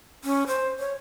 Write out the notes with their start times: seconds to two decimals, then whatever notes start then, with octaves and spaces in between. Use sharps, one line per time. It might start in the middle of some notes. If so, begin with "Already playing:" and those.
0.24 C#4
0.47 C5
0.79 C#5